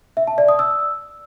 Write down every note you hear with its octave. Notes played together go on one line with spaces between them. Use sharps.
E5
A5
D5
D#6
E6